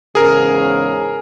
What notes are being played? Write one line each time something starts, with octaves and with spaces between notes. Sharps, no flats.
E2 G#2 C#3 G#4 A#4